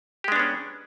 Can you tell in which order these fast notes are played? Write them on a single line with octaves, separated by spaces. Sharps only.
G4 G#3 D4 B3 C#4